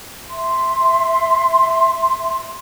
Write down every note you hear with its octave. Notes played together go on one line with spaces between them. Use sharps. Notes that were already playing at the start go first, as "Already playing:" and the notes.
E5 C6